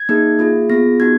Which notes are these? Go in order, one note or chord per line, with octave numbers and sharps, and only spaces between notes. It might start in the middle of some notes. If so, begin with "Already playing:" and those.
Already playing: G#6
A#3 D#4 G#4
A#3 F4 G#4
B3 F4 G#4 A#6
B3 D#4 F#4 G#6